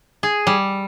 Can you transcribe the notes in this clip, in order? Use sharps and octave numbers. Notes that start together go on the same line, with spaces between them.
G#4
G3